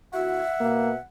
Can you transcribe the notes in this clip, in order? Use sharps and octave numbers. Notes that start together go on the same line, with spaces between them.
D2 E4 F#4 E5 F#5
B2 A#3